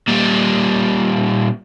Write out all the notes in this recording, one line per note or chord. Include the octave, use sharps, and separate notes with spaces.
A#2 G3